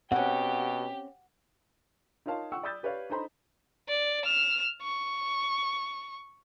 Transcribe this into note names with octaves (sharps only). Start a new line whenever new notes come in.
B2 C4 C#4 G4 F#5
D#4 F4 A#4 C#5 F5 A5
F#5 G5 C#6 E6
D5 B5 D#6 E6 G6 A6
G4 B4 C#5 D5 F5
D4 D#4 A4 C5 A#5 B5
D5
F6 E7
C#6